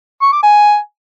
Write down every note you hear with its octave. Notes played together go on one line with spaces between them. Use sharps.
C#6
D6
G#5